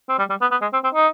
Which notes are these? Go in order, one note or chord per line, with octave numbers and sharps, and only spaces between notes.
C4
G3
G3
B3
B3
G#3
C4
C4
D#4